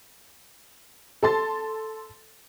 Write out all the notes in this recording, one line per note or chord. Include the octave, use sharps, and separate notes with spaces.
A4 A5 C6 A6